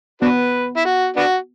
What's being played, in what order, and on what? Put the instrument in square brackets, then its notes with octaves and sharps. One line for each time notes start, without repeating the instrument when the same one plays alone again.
[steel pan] B3 [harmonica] D4 F#4 B4
[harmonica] E4
F#4
B3 D4 F#4